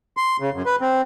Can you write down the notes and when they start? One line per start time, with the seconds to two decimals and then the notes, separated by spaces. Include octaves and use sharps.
0.17 C6
0.40 C#3
0.54 F#2
0.66 B4
0.81 C4